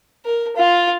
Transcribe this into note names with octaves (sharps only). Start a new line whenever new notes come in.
A#4
F4